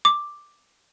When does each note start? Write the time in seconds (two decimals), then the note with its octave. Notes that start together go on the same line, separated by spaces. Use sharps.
0.05 D6